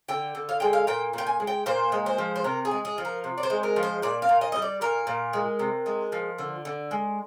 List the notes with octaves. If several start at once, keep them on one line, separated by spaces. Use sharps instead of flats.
D3 G5
D3
F5
G#3 G5
F5
A#2 G5
A#2 G5
G#5
G#3
G5
A#2 C5
G#3
C5
F3
C5
C3 A#4
G#4
G#3
G#4
F3
A#4
C3
D5
C5
G#3
A#4
F3
C5
A#2 D5
F5
A#2
D#5
G3 D#5
D5
A#2 A#4
A#2
G#3
C3
G#3
F3
D3
D3
G#3